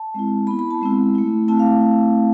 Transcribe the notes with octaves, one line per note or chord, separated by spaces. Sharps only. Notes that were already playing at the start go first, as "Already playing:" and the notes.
Already playing: A5
G#3 C4 E4
B3 E4 B5
B5
A5
G#3 C4 E4
A3 E4
A3 C4 E4 A5
F5